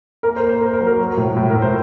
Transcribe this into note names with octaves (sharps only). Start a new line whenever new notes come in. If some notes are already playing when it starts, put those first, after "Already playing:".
A#3 A#4
C5
A#3
C5
A#3 A#4
A#4
F#3
A#4
F#3
A2
A2
A#4
A2
C5